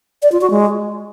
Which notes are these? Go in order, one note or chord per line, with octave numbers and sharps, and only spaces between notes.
D5
F4
F#4
G#3